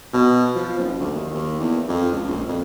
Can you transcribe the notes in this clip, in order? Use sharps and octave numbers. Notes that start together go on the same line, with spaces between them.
B2
F3
F#1
D2
D#2
D#2
E2
F2
C#2
A#1
F2